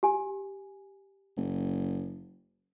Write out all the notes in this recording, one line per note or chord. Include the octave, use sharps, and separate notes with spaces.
G4 G#5
F#1